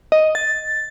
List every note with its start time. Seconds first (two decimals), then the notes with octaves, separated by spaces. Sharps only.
0.12 D#5
0.35 A6